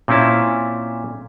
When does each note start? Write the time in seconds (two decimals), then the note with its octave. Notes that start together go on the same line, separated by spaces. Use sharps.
0.08 A#2 C4 C#4 E4 A5